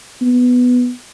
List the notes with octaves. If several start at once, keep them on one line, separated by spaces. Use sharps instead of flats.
B3